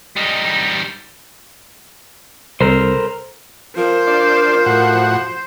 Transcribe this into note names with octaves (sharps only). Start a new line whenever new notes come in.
G3 D#4
C2 A4 A#4 C5
F3 A#4 C5
D4 F4 D5
A2 F#4 F#5